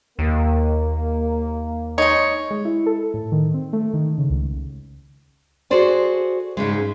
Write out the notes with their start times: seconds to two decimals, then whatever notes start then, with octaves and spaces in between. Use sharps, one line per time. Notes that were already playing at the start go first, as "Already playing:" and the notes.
0.19 D#2 A#3
1.98 G#3 D#4 C#5
2.51 G#3
2.65 E4
2.86 A4
3.14 A2
3.32 D#3
3.54 C4
3.73 A3
3.94 D#3
4.18 C#3
4.30 C#2
5.70 F#4 G#4 A4 C5 D5 G#5
6.57 G#2 C#3 G#3